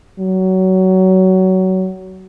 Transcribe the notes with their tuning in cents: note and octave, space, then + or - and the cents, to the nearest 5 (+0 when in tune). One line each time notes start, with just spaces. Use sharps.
F#3 +20